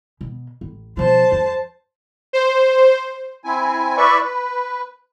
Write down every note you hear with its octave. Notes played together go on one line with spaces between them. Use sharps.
B2
A1
B2 F3 C5 A5
F2
C5
C4 E4 G#5
E4 B4 D5 E5 C#6
B4